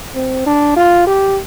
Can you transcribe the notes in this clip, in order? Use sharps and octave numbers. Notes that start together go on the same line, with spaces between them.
C4
D4
F4
G4